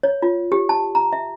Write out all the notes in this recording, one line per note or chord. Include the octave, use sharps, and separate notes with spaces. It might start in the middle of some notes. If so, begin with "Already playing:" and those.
C#5
F4
G4
A5
A#5
E5